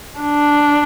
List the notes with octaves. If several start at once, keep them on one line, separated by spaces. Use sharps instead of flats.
D4